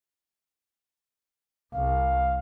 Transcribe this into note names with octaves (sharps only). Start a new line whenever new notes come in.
C2 F5